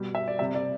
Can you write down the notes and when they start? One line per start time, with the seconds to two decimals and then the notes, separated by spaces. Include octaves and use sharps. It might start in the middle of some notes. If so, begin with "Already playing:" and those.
Already playing: B2 G3
0.15 E5
0.28 D5
0.39 C3 G3 E5
0.55 D5